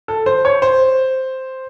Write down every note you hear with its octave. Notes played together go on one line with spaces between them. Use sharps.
A4
C5
C#5
C5